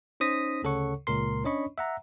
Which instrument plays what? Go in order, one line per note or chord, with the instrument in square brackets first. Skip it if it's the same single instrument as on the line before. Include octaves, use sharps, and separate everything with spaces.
[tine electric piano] C#4 D#4 C5 D#6 A#6 B6
D2 C#3 A4 C#5 F#5 C#6
C#2 A#2 A#4 C6
C#4 D4 C#5 D#5 B5 C#6
E5 F#5 A#5